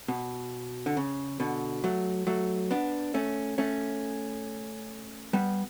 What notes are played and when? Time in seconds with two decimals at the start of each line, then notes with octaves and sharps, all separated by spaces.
0.08 B2
0.86 D3
0.97 C#3
1.40 B2 D3
1.84 F#3 A3
2.27 F#3 A3
2.71 B3 D4
3.14 A3 C#4
3.58 A3 C#4
5.33 G3 B3